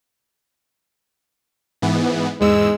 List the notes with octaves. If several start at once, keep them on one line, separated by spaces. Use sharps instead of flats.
G#2 E3 B3
E2 G#2 G#3 E6